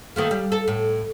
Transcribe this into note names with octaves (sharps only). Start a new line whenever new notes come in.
D#3 A3 A#3
G3
A4
A2